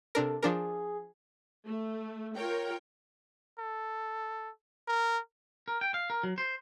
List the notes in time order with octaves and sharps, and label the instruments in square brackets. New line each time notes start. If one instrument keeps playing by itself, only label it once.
[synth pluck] C3 D4 A#4 [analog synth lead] A4
[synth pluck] F3 D4 A#4 [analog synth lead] G#4
[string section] A3
F4 A#4 C#5 G5
[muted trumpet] A4
A#4
[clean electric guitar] A#4
G5
F5
A#4
F#3
C5